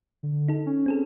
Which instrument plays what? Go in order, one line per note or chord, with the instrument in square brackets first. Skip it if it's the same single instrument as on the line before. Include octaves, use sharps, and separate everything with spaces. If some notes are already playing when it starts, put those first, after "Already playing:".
[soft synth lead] D3
[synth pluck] D#4 A4
[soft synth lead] C#4
[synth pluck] C4 G#4 A4